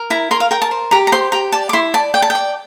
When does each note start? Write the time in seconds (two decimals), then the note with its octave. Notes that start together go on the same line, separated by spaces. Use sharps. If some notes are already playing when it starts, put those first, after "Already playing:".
Already playing: A#4
0.10 E4 A#5
0.31 A#4 C6
0.40 F5
0.51 A#4 G5
0.62 A5
0.71 C5
0.91 G4 A#5
1.07 A#5
1.12 C5 C6
1.32 G4 A#5
1.52 D5 A5
1.69 D6
1.73 E4 C6
1.94 D5 A5
2.14 D5 G5
2.22 A5
2.30 G5
2.35 D5